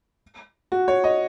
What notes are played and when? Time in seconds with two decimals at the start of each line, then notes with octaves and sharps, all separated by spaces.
0.72 F#4
0.88 C#5
1.04 D#5